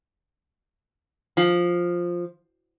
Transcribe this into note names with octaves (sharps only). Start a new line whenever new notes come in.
F3